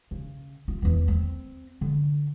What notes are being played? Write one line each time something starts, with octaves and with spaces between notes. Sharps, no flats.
C#3
F4
E2 E3
C4
D3